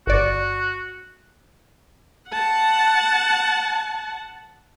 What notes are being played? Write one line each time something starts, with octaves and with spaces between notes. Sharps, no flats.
G1 F#4 D5
F#5 A5